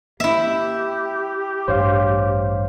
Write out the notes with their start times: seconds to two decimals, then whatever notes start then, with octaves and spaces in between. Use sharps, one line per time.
0.20 A#3 E4 G4 E5
1.68 A1 G2 C5 C#5 F5